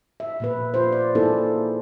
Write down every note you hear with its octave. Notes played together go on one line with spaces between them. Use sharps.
E5
A#2 A#3 B4
F4 C5
D5
A#3 D#4 E4 G#4 A4